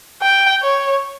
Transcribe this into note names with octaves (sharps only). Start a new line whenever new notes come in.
G5
C#5